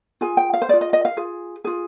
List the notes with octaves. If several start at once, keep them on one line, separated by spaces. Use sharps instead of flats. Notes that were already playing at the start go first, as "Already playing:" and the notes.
F4 G#4 G#5
G5
F5
C5
F4 G#4 D5
D#5
D#5
F5
F4 G#4
F4 G#4